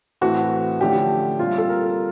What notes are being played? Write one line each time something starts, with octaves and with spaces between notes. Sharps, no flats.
A2 E3 A3 C4 F#4
D3 F3 A3 C#4 G4
A#2 G3 C4 F4
A4
A#4